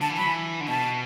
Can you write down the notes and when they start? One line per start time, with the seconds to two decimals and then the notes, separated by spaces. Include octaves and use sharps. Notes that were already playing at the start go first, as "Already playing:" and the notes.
0.01 D3 A5
0.09 E3
0.17 F#3 B5
0.26 E3
0.60 D3
0.68 B2 A5